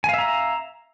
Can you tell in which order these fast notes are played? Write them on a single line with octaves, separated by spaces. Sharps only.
G#5 F5 E5 A#5